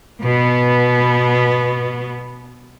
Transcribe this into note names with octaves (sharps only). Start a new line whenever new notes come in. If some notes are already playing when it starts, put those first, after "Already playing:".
B2 B3